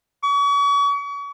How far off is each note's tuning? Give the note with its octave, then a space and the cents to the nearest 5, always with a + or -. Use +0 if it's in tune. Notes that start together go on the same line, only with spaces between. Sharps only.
C#6 +40